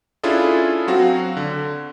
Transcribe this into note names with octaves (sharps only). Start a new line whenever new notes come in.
C#4 D4 E4 F4 G#4 A4
F#3 C4 F#4 F5
D3